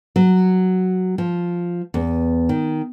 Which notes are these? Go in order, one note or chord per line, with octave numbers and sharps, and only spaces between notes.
F#3
F3
E2
D#3